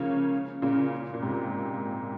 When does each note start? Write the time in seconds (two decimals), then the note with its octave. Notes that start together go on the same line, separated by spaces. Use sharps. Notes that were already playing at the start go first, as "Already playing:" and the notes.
Already playing: C#3 F3 A#3 C#4
0.62 A#2 C#3
1.14 A#2
1.22 G#2 C3